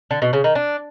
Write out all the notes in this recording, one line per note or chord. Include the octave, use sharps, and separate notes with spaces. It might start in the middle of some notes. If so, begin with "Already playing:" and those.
D3
B2
C#3
D#3
D4